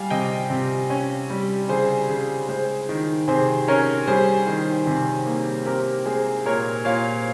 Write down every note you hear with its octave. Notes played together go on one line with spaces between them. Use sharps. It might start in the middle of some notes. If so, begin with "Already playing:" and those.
Already playing: G3 F5 G5 G#5
C3 D#5 G5
C3
C#4
G3
C#3 G#4 C5
C#3
G#3 G#4 C5
D#3
C3 G#4 C5
C#4 A#4 C#5
G3 G#4 C5
D#3
C3
A#3
C4 G4 A#4
G#3 G#4 C5
A#2 A#4 C#5
A#2 C#5 F5